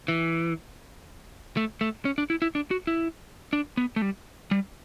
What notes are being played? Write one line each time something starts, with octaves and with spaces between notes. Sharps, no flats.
E3
A3
A3
C#4
D4
E4
E4
D4
F#4
E4
D4
B3
A3
G3
G3